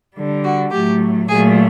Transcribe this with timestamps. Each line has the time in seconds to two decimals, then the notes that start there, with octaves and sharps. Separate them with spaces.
0.15 D3 G3
0.44 F#4
0.71 A2 F#3 A3 G4
1.28 A#2 F#3 A3 G#4